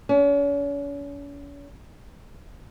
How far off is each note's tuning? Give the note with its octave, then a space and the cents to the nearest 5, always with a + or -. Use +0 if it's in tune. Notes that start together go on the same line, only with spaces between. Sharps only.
C#4 +40